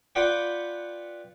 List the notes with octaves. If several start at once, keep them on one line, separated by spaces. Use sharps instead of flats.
F4 B4 D5 F#5 G5